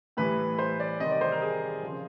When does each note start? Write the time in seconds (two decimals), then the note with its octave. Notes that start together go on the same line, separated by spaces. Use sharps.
0.17 A2 E3 G3 B4
0.58 C5
0.80 D5
1.00 C3 D#3 G3 D#5
1.11 D5
1.21 C5
1.32 A#4
1.42 G#4
1.83 C#3 F3